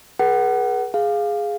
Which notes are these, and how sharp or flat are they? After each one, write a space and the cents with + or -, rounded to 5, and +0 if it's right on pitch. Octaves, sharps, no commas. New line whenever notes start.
G#4 +15 B4 -45 F#5 +25
G#4 +0 F5 +0